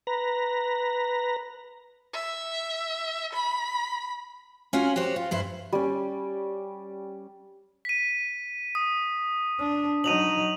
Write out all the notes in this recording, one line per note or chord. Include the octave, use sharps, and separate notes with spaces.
B4 A#5
E5
B5
C#4 F4 F#4 F#5 G#5
F#4 G4 C5 C#5
F4
G2 E4 C5
G3 C#4
B6 D#7
D#6
D4
F#3 D#4 D#7 F7 F#7